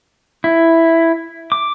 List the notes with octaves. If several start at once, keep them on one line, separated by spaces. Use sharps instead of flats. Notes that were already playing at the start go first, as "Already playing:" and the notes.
E4
D6